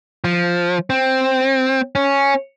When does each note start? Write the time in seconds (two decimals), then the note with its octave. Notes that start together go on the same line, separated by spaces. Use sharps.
0.24 F3
0.90 C4
1.95 C#4